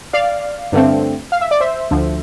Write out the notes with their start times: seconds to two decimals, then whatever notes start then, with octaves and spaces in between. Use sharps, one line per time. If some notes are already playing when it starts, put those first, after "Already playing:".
0.13 D5 F5
0.72 G2 D3 A3 C4
1.32 F5
1.41 E5
1.51 D5
1.61 C5 E5
1.91 D2 D3 F3